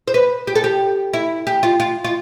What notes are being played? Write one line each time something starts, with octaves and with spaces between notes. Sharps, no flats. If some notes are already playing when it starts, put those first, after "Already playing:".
C5
B4
G4
A4
G4
E4
G4
F4
F4
F4